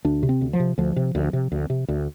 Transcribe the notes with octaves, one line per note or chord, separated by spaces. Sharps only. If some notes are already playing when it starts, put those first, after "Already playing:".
D2 D4
C3
C4
D2
F3
C3
D2 F3
C3
D2
C3
D2
C3
D2